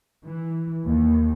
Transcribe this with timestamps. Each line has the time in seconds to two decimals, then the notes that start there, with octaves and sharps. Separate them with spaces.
0.24 E3
0.84 D#2